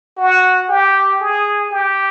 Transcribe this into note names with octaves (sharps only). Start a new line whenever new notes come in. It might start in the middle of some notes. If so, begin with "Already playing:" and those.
F#4
G4
G#4
G4